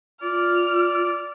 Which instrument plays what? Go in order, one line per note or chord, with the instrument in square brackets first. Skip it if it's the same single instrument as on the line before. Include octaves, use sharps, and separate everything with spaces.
[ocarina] F4 [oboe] D5 [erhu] F6